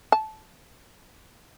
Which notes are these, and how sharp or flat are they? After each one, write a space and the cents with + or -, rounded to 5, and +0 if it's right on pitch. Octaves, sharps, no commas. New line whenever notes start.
A5 -15